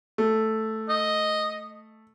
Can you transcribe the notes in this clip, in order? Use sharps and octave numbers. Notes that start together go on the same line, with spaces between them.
A3
D#5